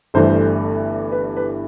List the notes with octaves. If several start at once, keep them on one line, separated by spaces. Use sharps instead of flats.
G1 G2 E3 A3 C5
B4
B4